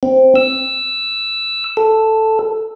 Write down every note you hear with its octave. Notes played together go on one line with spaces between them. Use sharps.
C4
E6
A4